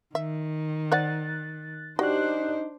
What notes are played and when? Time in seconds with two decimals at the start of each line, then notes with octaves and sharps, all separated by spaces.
0.15 D#3 E5
0.92 C5 D5 F#5 F#6 A6
1.99 D4 D#4 F#4 G4 C5 D5 F#6